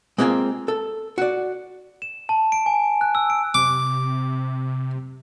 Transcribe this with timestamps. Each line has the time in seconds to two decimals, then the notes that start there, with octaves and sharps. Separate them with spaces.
0.18 G#3 A#3 C4 F4 G#5
0.68 A4
1.18 F#4 D5
2.02 E7
2.29 A5
2.52 D7
2.66 G#5
3.01 F#6
3.15 E6
3.30 D7
3.54 C3 D6